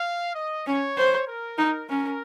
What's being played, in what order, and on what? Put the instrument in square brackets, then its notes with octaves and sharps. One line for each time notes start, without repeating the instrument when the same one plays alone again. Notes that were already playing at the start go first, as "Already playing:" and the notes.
Already playing: [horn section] F5
D#5
[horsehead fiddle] C#4 [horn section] C#5
[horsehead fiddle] C5
[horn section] A#4
[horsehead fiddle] D#4
[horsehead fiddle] C#4 [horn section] A#4